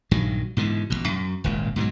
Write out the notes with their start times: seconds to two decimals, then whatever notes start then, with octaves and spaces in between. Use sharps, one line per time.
0.11 A#1 G2 D#3 F#3
0.57 G#2 B2 D3 E3
0.90 A1 G#2 B2
1.08 F#2
1.44 D#1 G#1 C#2 A#2
1.76 G#2 B2 F3 F#3